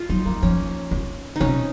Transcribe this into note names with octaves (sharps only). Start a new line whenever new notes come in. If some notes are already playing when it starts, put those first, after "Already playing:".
Already playing: F4
F#3 D#4
F3 A#3
F3 C#4
C#3
C3 C#4 D#4